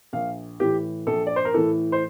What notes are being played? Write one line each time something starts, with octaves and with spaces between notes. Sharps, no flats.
A#1 F5
A2 E3 G4
A#1 A4
D5
C5
A#4
A2 E3 A4
C5